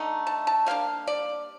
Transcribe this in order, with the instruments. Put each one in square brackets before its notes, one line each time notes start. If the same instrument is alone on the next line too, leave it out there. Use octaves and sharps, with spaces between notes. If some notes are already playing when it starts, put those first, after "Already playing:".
Already playing: [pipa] D3 A3 D#4
A5
A5
G3 A#3 D4 F5
D5